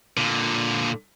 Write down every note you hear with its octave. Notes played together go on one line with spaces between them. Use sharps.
A#2 D3